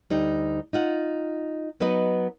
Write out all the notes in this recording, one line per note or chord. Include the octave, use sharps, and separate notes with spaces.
D2 G3 D#4
D#4 F4 F#5
F#3 B3 D#4 B4 D#5